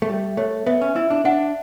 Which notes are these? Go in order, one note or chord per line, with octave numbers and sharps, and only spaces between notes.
A3
G3 E5
A3 C#5
B3 E5
C#4
E4 E5
D4
D4 F#5